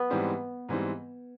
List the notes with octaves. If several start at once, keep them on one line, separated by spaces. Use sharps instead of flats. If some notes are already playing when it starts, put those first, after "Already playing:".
Already playing: B3
G#2 E3 G3 C4
G#2 E3 G3 C4